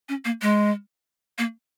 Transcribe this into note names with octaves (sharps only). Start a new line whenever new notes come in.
C#4
A#3
G#3
A#3